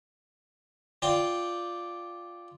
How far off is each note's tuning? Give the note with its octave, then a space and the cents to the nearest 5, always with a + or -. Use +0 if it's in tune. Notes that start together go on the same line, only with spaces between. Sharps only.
F4 +0 D5 +0 G5 +0